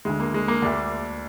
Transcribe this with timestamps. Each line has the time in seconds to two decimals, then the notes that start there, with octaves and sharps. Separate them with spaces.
0.05 D2 D3 G#3
0.20 A#3
0.34 G#3
0.48 A#3
0.62 D2 D3 D4